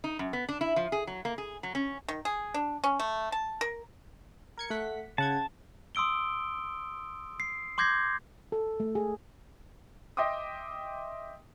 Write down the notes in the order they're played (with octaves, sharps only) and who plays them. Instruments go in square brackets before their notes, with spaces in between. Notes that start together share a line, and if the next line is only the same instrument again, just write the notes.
[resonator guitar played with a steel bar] D#4
F#2
B3
D4
E4
F3
G#4
F#3
A#3
G#4
F#3
C#4
[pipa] D#3
G#4
D4
C#4
A3
A5
A#4
[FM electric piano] A#4 G#6 C#7
A3 F#5 B6
[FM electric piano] C#3 F#5 G#6 [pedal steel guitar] A5
[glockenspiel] C6 D#6 E6 D7 G7
C7
C6 D6 G6 G#6 A#6 C7
[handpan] A4
A3
G#4
[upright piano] D#5 E5 G5 C6 D6 D#6